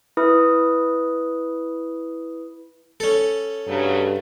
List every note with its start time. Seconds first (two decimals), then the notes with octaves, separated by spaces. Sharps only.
0.17 E4 B4 D#6
3.00 C#4 A4
3.67 G2 C#3 F#3 A3